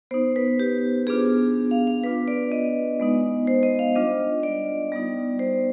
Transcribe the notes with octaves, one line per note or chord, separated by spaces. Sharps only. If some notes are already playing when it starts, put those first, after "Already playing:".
B3 D#4 C5
B4
G4
B3 D4 F4 G#4
F5
F5
B3 D4 F4 B4
D5
D#5
G#3 B3 D#4
C5
D#5
F5
G3 D4 F4 D#5
D5
G3 B3 D#4
C5